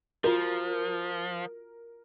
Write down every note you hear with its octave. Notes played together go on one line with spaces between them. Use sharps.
F3 F4 F#4 A#4